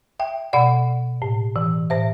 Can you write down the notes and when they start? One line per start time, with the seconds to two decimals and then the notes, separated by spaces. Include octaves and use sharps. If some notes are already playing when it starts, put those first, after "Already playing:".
0.20 E5 G5
0.53 B2 D5 F#5
1.22 A2
1.56 E3
1.90 A2 C5 E5